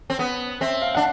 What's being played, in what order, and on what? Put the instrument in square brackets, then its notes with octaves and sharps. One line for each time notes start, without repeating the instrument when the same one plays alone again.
[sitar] C4
B3
[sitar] C4 [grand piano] E5
[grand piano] F5
[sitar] D4 [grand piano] F#5